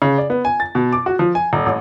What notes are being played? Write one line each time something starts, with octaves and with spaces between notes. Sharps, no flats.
C#3
D5
B3
G#5
A6
B2
D6
F#4
F3
G#5
D#1
A1